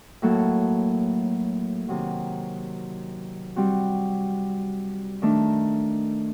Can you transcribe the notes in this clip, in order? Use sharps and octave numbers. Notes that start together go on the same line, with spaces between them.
A2 F#3 A#3 F#4 A4
C3 D#3 F#3
G3 C4 F#4
D#3 A3 D4